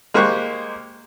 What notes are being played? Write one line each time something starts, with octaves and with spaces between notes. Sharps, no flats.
G#3 A#3 G4 C5 C#6 F#6